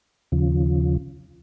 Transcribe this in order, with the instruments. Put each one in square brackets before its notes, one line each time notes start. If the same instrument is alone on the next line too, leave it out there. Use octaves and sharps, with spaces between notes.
[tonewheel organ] D#2 C#3 F3